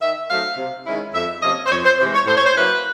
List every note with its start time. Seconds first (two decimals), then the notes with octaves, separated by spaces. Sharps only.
0.01 D#3 E5
0.29 F#3 A3 C4 D#4 F5
0.58 C3
0.86 D#3 G#3 C#4 E4
1.14 F2 E5
1.43 C3 F3 A#3 C#4 D#5
1.66 C5
1.71 F2 C#5
1.85 C5
2.00 C3 E3 G#3 C5
2.14 C#5
2.27 A2 C5
2.37 C#5
2.46 C5
2.56 F#3 A#3 C#4 E4 B4